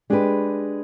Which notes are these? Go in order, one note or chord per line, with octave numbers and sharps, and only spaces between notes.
G#3 D4 G4 B4